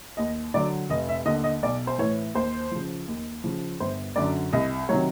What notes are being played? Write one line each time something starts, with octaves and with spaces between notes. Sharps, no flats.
D#2 D#5
D3 F#3 D5
F1 D#5
E5
D#2 D3 D#5
D#5
B1 D5
C5
A2 E3 C#5
D#2 C5
C#3 F3
D#2
C#3 F3
G1 C5
F#2 D3 F#3 D5
C2 D#5
C3 D#3 F#3 C#5